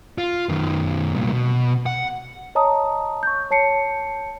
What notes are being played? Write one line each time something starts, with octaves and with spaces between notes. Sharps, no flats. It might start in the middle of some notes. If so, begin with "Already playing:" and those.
F4
F#2 D#3
C2 A#2
B2
F#5
C#5 D#5 A5 A#5 D#6
C#6 G6
C#5 A5 C7 C#7